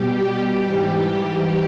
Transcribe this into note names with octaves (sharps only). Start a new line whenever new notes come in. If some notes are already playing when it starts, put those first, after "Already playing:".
Already playing: B2 G3 G4
G#2 E3 G3